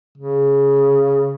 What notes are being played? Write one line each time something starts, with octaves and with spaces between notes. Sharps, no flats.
C#3